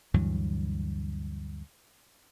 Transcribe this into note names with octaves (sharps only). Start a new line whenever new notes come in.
D2 G2 E3 F#3